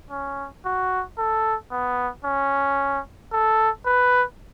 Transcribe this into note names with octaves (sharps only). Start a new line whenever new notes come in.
C#4
F#4
A4
B3
C#4
A4
B4